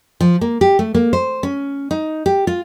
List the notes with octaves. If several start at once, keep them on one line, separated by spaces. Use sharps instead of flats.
F3
A#3
G4
A3
A#3
C5
C#4
D#4
G4
F4